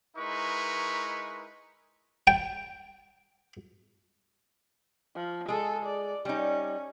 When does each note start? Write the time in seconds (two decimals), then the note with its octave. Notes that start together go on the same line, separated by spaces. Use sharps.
0.17 G#3 D#4 E4 A#4 B4 C#6
2.27 G5
5.15 F3
5.48 G#3 G#4 A4
5.85 D5
6.25 G3 C#4 D#4